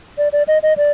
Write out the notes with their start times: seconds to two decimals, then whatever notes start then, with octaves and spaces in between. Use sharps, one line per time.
0.18 D5
0.33 D5
0.48 D#5
0.63 D#5
0.77 D5